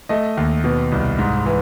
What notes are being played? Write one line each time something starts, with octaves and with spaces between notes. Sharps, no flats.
A3 D#5
D#2
B2
C2
G#2
E3